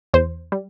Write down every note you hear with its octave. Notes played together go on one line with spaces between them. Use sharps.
E2 C5
G3